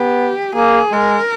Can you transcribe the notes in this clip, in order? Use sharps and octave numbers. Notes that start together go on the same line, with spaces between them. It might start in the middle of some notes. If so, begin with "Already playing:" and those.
Already playing: B3 G4
A#3 G#4
G#3 A#4